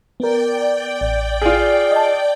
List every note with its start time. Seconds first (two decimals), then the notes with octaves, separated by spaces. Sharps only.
0.20 B3 A#4 D5 G5
1.01 A1
1.42 F4 G#4
1.91 D#5 A5